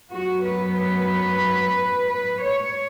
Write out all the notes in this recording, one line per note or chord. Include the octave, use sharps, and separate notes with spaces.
F#2 F#3 B3 F#4
B4
B4
B4
C#5